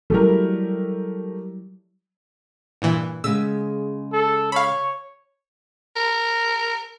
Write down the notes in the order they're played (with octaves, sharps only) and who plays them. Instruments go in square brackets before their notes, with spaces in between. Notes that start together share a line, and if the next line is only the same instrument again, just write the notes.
[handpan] F#3 G3 E4 [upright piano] A3 G4 A#4
[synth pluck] G2 A#2 E3
[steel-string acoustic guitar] C#3 G#3 [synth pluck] E6
[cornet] A4
[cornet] C#5 [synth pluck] F5 B5
[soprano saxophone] A#4